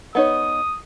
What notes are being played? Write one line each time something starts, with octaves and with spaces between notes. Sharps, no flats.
B3 D#4 C#5 D#6